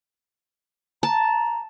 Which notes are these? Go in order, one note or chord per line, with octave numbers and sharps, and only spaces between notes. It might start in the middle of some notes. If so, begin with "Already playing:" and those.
A5 A#5